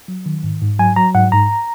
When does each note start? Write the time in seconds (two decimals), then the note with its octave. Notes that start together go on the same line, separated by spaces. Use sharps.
0.08 F#3
0.26 D#3
0.44 G#2
0.62 G#2
0.79 F#3 G#5
0.96 F#3 A#5
1.14 G#2 F#5
1.32 G#2 A#5